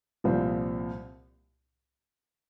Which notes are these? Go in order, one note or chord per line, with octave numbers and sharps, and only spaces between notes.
C2 A#2 F3 C4